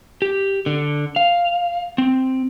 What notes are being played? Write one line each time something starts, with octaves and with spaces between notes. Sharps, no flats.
G4
D3
F5
C4